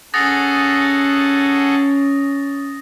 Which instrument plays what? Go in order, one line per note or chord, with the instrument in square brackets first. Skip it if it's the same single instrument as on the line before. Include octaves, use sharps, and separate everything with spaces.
[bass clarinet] C#4 [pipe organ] G#4 A4 F#5 [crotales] D#6 A6 A#6